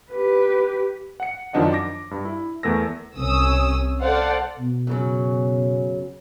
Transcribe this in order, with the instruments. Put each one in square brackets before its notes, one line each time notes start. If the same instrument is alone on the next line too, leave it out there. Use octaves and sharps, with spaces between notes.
[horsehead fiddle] G4 B4
[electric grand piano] F#5 C#7
F#2 D#3 F3 D4 D#5 F#5
D6 A#6
G2
E4
E2 A3 A#4 E6 A#6
[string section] C2 C#4 D#6 E6
A4 C5 D5 F5 F#5
[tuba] B2
[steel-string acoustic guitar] F#2 C#3 F#3